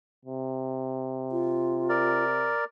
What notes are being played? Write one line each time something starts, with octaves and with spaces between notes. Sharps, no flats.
C3
F4
A#4 D5